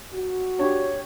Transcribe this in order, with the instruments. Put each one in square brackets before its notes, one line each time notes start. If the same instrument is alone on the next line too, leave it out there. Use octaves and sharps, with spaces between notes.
[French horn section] F#4
[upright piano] D4 G4 [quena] C#5